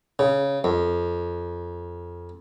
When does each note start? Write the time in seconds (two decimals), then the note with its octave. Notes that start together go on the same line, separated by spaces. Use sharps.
0.19 C#3
0.64 F2